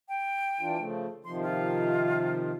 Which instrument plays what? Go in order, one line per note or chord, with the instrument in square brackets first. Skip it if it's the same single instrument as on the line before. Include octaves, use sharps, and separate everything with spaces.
[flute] G5
[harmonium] E3 D4 F4
C#3 F3 A3
[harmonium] C3 D#3 F3 [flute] C6
[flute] F4